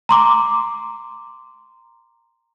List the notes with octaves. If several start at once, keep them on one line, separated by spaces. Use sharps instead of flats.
A#5 C6 D6